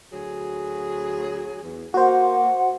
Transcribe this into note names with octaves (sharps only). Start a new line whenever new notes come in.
D2 F#3 G#4
E2
A#3 F#4 C5 F#5